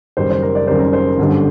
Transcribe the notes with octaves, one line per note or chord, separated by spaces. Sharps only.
F#1 F#2 D#3 G3 C5
C5
A#4
D5
F#1 F#2 D#3 G3 C5
A#4
C5
G1 F#2 D3 G3